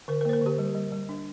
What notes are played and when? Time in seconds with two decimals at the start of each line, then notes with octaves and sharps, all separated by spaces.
0.08 D3 A#4
0.21 A#4
0.25 A#3 C5
0.33 A#4
0.41 D3 G4
0.58 G3
0.75 G3
0.92 G3
1.09 D4